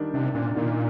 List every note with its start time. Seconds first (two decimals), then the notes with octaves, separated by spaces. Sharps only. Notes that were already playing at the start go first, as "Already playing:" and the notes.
Already playing: D#3 G3 D4
0.14 C3 D4
0.34 A#2 D4
0.55 A#2 D#3